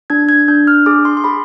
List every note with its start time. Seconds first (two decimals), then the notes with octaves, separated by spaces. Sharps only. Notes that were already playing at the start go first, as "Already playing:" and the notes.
0.10 D4 G#6
0.29 G#6
0.48 D4 G6
0.67 F6
0.86 G#4 D6
1.05 C6
1.17 C6
1.24 G#4 B5